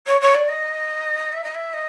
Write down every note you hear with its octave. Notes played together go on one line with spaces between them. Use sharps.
C#5
C#5
D5
D#5
E5
D#5
E5
D#5